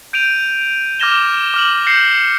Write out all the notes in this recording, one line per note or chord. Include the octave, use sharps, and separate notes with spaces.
G6 D7 D#7 F7
D6 F6 G#6 A#6 E7 G7
D6 F6 F#7
G6 A#6 C7 C#7